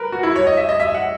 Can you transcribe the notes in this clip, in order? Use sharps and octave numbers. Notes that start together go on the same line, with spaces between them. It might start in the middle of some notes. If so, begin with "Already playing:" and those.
Already playing: A#4 B4
F#4
E4
C#5
D#5
E5
D#5
E5
F#5